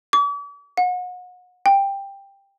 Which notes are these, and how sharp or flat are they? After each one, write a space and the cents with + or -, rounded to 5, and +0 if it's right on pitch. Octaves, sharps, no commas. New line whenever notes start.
D6 -45
F#5 -35
G5 +10